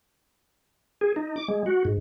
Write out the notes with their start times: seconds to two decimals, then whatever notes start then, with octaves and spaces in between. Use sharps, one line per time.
1.01 G#4
1.16 D#4
1.36 D6
1.48 G#3
1.66 F#4
1.85 G#2